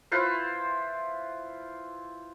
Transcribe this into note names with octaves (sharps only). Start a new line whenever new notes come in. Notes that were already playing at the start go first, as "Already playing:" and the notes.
E4 F4 B4 C5